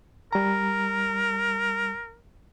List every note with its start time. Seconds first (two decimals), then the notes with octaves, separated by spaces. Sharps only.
0.33 G3 A#4 A#5